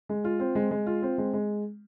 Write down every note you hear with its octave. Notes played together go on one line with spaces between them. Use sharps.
G#3
F4
C4
G#3
G#3
F4
C4
G#3
G#3